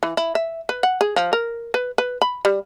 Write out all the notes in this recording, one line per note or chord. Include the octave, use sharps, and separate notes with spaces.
E3
E4
E5
B4
F#5
G#4
F3
A#4
B4
B4
B5
G3